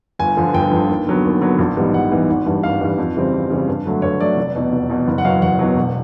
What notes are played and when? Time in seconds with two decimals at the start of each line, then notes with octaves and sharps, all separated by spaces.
0.19 G1 G#5
0.37 G2 D3 F3
0.54 G1 G5
0.71 G2 D3 F3
0.89 D#2
1.07 D3 F#3 B3
1.24 D#2
1.41 D3 F#3 B3
1.59 A#1
1.76 G#2 E3 G3 B3
1.93 A#1 F#5
2.11 G#2 E3 G3 B3
2.29 G#1
2.46 G2 E3 G3
2.63 G#1 F5
2.81 G2 E3 G3
2.98 F2
3.16 C#3 E3 G3 C4
3.33 F2
3.50 C#3 E3 G3 C4
3.68 G2
3.86 D3 F#3 A3
4.02 G2 C#5
4.20 D3 F#3 A3 D5
4.37 F1
4.55 E2 B2
4.73 F1
4.90 E2 B2
5.07 F#1
5.18 F#5
5.24 E2 B2 F#3 F5
5.42 F#1 F#5
5.59 E2 B2 F#3
5.77 E1